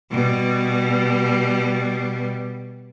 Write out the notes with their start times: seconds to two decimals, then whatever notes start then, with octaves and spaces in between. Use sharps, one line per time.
0.11 B2 G3